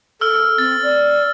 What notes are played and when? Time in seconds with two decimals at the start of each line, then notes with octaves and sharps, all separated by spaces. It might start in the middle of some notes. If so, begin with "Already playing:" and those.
0.21 A4 E6 F6
0.58 C4 A6
0.83 D5